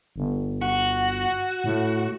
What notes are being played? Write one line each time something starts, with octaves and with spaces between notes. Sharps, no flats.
G1
F#4
A2